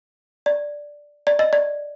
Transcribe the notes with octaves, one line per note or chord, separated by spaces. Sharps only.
D5
D5
D#5
D5